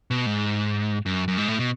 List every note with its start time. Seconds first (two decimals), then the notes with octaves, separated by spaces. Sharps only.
0.11 B2
0.26 G#2
1.06 F#2
1.28 F#2
1.38 G#2
1.48 A2
1.59 B2